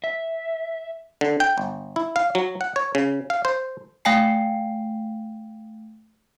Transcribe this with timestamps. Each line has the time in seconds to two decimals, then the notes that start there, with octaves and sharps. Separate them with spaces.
0.04 E5
1.21 D3
1.40 G5
1.58 G1
1.96 E4
2.16 F5
2.35 F#3
2.61 F#5
2.76 C#5
2.95 C#3
3.30 F5
3.45 C5
4.05 A3 F5 G5 G#5 C7